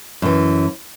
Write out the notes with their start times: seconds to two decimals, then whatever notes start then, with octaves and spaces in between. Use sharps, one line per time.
0.22 F#2 E3